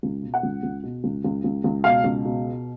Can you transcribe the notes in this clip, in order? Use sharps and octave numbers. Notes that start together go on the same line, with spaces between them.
C#2
B2
F#5
C#2
C#2
B2
C#2
C#2
C#2
C#2
B2 F5
C#2
B2